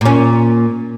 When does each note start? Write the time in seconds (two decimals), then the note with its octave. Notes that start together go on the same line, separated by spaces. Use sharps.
0.01 A#2 C#4